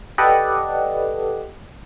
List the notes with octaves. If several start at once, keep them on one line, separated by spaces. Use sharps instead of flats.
G4 A4 B4 D5 D#5 F#5